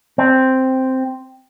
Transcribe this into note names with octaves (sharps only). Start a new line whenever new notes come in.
C4